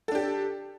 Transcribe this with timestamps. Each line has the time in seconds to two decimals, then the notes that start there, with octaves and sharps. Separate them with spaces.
0.08 A4
0.12 D4
0.15 G4